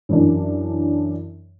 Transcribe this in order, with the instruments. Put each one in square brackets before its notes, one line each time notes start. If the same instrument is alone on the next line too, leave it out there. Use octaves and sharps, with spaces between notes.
[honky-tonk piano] F#2 E3 D4